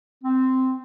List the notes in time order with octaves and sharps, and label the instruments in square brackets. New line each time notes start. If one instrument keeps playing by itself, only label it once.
[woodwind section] C4